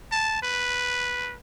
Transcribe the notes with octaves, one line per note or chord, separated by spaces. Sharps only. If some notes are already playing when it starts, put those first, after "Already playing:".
A5
B4